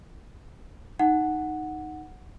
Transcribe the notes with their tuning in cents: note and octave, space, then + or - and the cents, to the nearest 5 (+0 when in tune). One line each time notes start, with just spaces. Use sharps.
D#4 +0 F#5 +0